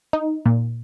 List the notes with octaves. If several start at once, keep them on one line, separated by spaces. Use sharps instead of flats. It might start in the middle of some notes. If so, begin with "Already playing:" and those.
D#4
A#2